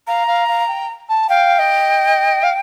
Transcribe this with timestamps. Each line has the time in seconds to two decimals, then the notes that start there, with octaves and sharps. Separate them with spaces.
0.07 F5 A#5
0.27 F5
0.48 F5
0.68 G5
1.09 A5
1.29 F5 G5
1.59 D#5
2.43 F5